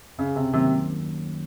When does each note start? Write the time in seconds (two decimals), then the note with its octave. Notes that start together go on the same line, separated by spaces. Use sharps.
0.18 F#2 C#3
0.36 C3
0.53 C3 D#3 F#3 A#3 C#4